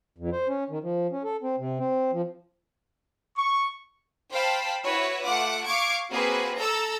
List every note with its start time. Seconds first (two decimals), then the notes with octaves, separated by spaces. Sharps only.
0.18 F2
0.33 C5
0.48 C#4
0.70 D#3
0.83 F3
1.12 C#4
1.24 A4
1.42 C4
1.58 C3
1.79 C4
2.13 F3
3.36 C#6
4.31 C5 F5 G5 A5 B5
4.85 E4 F#4 B4 C#5
5.25 A3 F4 F#5 D6
5.66 F5 C#6 D6 G#6 D7
6.10 A#3 C4 F#4 G#4 B4
6.58 A4 A#5 E6 A6